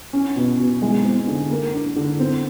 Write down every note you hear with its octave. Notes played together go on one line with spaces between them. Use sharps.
C#4
B2
B2
G#3
C4
D3
A#3
D4
D3
C4